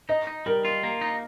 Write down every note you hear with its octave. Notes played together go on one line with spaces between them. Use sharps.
D#4 D#5
D#4
G3 A#4
F4
A#3
D#4